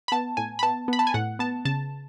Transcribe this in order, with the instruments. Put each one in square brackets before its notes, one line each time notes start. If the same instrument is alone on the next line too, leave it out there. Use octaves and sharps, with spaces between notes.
[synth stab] B5
B3 A5
A2 G#5
B5
B3 A5
B3 B5
A5
G#5
A2 F#5
B3 A5
C#3 A5